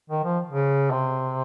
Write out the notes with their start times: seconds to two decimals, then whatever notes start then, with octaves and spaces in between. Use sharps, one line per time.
0.10 D#3
0.24 F3
0.51 C#3
0.91 C3